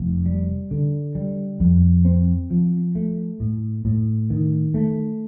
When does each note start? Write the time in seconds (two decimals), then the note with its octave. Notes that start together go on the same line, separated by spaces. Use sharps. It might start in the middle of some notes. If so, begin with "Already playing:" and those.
Already playing: F1
0.26 G3
0.71 D3
1.15 G3
1.60 F2
2.05 C4
2.51 F3
2.95 A3
3.40 A2
3.85 A2
4.30 D#3
4.74 A3